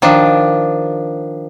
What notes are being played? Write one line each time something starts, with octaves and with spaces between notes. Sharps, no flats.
D#3 F3 D4